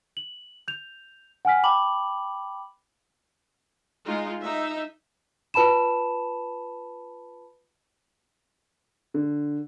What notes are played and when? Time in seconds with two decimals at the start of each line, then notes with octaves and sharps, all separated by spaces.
0.17 F#7
0.68 G6 F7
1.45 F#5 G#5 F6 B6
1.63 G5 A5 B5 D6 F#7
4.05 G#3 D#4 F4
4.41 D#4 E5
5.54 F4 B4 A5 B5 E7
9.14 D3